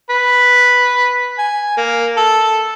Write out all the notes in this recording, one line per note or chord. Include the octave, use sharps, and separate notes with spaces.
B4
G#5
A#3
A4